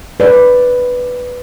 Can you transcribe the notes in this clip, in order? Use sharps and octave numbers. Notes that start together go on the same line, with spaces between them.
B4 D5